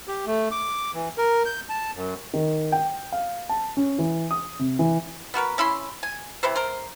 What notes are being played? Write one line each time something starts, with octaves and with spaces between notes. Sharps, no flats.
G4
A3
D6
E3
A#4
G6
A5
F#2
D#3
G5
F5
A5
C#4
E3
D#6
C3
E3
B3 F#4 A#4 B4
C#4 E4 B5 C6
G#5
C3 E3 B4 C5
A#4 C5